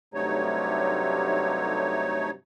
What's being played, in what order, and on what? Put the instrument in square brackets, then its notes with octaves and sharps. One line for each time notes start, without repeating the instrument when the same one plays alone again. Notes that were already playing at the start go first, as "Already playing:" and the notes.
[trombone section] G2 C3 F#3 [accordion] A3 D#4 C#5